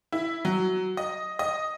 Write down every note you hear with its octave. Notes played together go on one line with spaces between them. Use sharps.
E4
F#3
D#5
D#5